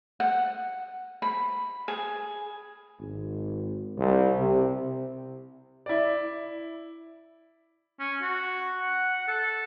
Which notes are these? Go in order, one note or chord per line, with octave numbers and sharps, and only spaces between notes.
F#5
B5
G#4
G#1
C2
C3
E4 D5
C#4
F#4
F#5
A4